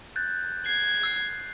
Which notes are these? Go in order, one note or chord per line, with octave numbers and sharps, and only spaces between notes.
F#6 G6 A6
G#6 C7
E6 C7